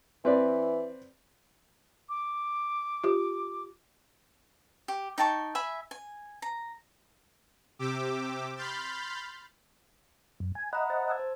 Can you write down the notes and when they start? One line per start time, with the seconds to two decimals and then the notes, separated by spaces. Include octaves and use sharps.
0.25 E3 C4 B4 D5
2.09 D6
3.04 F4 G4
4.88 G4
5.18 D#4 G5 A5 C#6
5.55 E5 G#5 B5
5.91 G#5
6.42 A#5
7.79 C3 G4 D6 E6
8.56 B5 C6 F6 G6 A6
10.40 F#2
10.55 G#5
10.73 D#5 E5 F#5 A#5 B5
10.90 C5 A6
11.08 A5 E6 G#6
11.19 C5